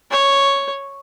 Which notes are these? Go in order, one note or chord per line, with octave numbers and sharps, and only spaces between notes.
C#5